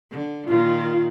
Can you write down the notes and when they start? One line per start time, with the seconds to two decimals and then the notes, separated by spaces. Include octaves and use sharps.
0.11 D3
0.48 A#2 D#3 F4